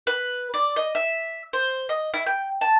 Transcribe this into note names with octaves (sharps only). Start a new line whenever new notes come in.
B4
D5
D#5
E5
C5
D#5
E4
G5
A5